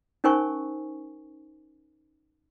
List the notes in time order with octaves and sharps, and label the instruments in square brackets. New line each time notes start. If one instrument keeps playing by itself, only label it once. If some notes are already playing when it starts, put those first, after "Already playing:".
[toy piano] C#4 D#4 A#4 C5 G#5 C#6